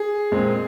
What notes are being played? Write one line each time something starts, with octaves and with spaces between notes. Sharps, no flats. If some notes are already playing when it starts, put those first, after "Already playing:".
Already playing: G#4
A#2 G#3 C4